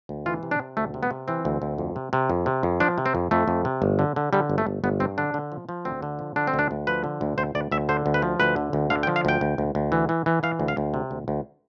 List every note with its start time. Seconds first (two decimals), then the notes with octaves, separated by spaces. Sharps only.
0.09 D2
0.26 E3 F4
0.43 C3
0.51 D4
0.60 C3
0.77 D2 A3
0.94 C3
1.03 B3
1.11 C3
1.28 E3 C4
1.45 D2
1.62 D2
1.78 F2
1.96 C3
2.13 C3
2.30 F2
2.46 C3
2.63 F2
2.80 F3 D4
2.98 C3
3.06 C4
3.15 F2
3.31 F2 A3
3.48 F2
3.65 C3
3.82 G1
3.99 D3
4.16 D3
4.33 D3 G3
4.50 G1
4.58 A3
4.67 G1
4.84 G1 B3
5.00 G2 C4
5.18 D3 D4
5.34 D3
5.52 F3
5.69 F3
5.85 D2 C4
6.02 D3
6.19 F3
6.36 D3 D4
6.47 C4
6.54 D2
6.59 D4
6.71 D2
6.87 F3 B4
7.04 D3
7.21 D2
7.38 D2 C5
7.55 D2 D5
7.72 D2 E5
7.89 D3 C5
8.06 D2
8.14 B4
8.22 F3
8.40 D2 B4
8.56 D3
8.73 D2
8.90 D3 F5
9.03 G5
9.07 F3
9.16 F5
9.25 D2 G5
9.41 D2
9.58 D2
9.75 D2
9.92 E3
10.09 E3
10.26 E3
10.43 E3 F5
10.59 D2
10.68 F5
10.77 D2
10.94 C3
11.11 D2
11.28 D2